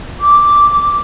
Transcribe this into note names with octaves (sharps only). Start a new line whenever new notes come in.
D6